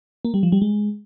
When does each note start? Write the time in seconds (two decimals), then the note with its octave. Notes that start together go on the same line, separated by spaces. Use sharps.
0.25 A#3
0.34 G3
0.43 F3
0.52 G3
0.62 G#3